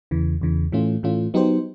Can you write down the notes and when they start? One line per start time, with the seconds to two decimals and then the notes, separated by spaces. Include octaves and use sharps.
0.11 E2 C#3 E3
0.41 E2 C#3 E3
0.72 A2 E3 A3 C#4 F4
1.03 A2 E3 A3 C#4 F4
1.34 F#3 B3 D#4 G4 C5